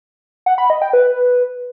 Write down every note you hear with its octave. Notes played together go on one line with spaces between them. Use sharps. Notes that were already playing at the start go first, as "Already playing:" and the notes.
F#5
B5
D#5
G5
B4